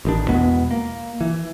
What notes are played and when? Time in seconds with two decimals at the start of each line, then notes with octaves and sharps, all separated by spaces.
0.05 A1 D#3 D4
0.28 E2 B2 G#3 B3
0.71 A#3
1.21 E3